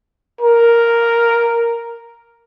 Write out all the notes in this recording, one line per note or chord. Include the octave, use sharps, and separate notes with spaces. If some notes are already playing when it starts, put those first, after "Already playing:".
A#4